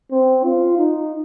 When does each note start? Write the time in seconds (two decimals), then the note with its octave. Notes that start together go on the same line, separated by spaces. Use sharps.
0.11 C4
0.44 F4
0.78 D#4